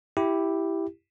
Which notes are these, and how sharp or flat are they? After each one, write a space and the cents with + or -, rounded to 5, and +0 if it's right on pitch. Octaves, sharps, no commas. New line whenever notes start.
E4 +0 G4 +0